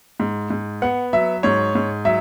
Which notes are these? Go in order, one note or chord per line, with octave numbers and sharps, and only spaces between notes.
G#2
G#2
B3 F#5
F#3 E5
G#2 C#5
G#2
F#3 E5